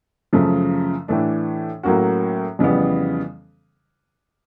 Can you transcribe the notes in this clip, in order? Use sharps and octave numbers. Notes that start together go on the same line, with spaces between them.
F#2 C#3 F3 A3
A2 E3 A3 D4
A2 F#3 A#3 C#4 F#4
F2 C#3 E3 G3 B3